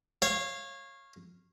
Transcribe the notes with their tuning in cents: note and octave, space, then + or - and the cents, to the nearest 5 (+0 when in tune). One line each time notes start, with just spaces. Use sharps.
C#5 -25 F5 -5